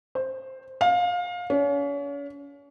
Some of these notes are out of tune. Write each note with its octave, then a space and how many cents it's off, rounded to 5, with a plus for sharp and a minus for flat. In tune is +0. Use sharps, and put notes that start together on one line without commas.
C5 +5
F5 +25
C#4 +40